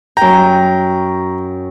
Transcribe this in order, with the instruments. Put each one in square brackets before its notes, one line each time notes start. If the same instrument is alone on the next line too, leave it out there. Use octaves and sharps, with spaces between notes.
[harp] F#2 G5 [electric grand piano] A#5